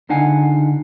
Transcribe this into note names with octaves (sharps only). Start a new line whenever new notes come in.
C#2 D3 D#4 F5 F#5 G#5